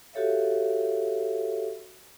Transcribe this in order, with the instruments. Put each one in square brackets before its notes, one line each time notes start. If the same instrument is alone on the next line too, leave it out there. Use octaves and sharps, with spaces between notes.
[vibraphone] F#4 G4 A4 C#5 E5 F5